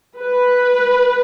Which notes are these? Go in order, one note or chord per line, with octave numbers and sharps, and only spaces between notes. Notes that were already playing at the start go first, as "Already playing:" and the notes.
B4